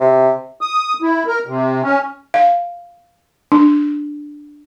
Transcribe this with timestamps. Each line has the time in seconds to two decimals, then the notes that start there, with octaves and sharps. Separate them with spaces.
0.01 C3
0.61 D#6
1.02 E4
1.27 A#4
1.47 C3
1.82 C#4
2.34 F5
3.52 D4